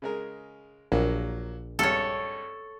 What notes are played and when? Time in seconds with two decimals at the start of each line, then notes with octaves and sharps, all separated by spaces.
0.02 C#3 G#3 A#4
0.92 A#1 F#3 A#3
1.79 G#1 G2 A4 C#5 F6